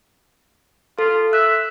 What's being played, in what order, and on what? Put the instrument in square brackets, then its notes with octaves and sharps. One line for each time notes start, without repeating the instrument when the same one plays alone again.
[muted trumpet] F4 [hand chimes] A4
[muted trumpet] E5 [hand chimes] F#6